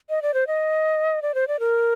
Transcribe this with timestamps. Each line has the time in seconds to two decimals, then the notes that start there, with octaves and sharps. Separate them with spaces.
0.09 D#5
0.22 D5
0.34 C5
0.47 D#5
1.22 D5
1.34 C5
1.48 D5
1.59 A#4